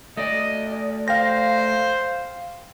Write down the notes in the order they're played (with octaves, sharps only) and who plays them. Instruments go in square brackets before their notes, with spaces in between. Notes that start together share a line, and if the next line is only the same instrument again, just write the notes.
[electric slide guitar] A3 D5 [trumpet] D#5
[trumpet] C5 [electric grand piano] F5 G5 A#6